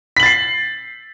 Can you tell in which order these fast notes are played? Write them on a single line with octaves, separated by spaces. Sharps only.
B6 F#7 A6 C7